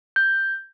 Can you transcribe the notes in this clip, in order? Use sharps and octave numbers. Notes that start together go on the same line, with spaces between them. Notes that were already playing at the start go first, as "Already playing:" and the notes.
G6